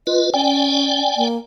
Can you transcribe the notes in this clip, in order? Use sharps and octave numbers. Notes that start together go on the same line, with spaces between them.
F4 B4 D#5
C#4 D5 G5 G#5
A#3